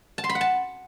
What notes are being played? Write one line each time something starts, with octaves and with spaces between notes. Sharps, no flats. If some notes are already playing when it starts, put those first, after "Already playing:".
A5
C6
B5
F#5
A5